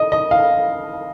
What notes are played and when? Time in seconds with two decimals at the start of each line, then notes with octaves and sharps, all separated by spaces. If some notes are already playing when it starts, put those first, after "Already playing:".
Already playing: D#5
0.12 D#5
0.31 F5